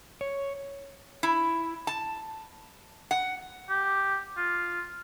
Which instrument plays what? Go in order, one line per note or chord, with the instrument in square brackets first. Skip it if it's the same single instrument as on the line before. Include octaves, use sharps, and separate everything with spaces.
[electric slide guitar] C#5
[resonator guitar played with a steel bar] E4
A5
F#5
[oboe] G4
F4